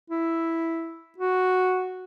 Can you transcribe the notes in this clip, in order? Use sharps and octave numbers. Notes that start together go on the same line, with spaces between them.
E4
F#4